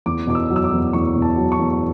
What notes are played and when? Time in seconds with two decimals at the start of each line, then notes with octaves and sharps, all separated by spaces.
0.06 E2 D6
0.27 B2 D6
0.35 E6
0.50 F#3
0.56 E6
0.64 D6
0.72 E2
0.93 E2 C#6
1.16 B2
1.22 A5
1.37 F#3
1.52 C#6
1.59 E2